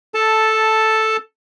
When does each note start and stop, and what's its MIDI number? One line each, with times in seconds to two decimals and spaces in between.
0.14 1.17 69
0.14 1.17 81